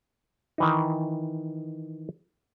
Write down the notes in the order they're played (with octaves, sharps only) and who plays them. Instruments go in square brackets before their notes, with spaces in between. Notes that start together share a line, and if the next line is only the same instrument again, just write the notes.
[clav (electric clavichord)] D#3 E3 D#4